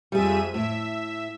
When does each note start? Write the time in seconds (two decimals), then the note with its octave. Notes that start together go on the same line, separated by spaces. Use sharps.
0.12 F2 G3 G#4 E5 D#7
0.54 A2 E5